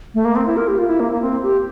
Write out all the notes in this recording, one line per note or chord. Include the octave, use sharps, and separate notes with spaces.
A3
A#3
C4
E4
A#4
G4
F4
E4
A#3
A#3
C4
G4